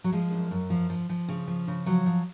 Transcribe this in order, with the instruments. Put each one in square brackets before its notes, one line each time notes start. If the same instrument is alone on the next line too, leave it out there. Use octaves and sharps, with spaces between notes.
[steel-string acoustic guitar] F#3
F3 G#3
F#2
F#2
F3
F3
F3
C#3
F3
C#3
F3 F#3
F3